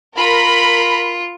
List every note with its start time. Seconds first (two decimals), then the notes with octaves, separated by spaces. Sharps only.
0.17 F4 A#4 B5